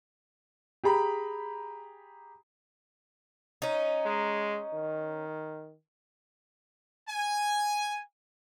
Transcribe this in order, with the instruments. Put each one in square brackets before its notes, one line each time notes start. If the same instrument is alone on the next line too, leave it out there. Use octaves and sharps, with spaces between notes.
[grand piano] G4 G#4 A#5 B5
[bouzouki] C#4 D#4
[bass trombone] G#3
D#3
[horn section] G#5